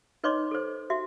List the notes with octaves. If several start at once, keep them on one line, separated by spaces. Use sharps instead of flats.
D#4 B4 C#5 D#5 C6 D6
A4 C5
F#4 E5